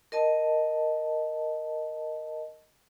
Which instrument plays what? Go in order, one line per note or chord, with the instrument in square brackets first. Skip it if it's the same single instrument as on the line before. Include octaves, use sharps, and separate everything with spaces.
[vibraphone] A#4 D#5 A5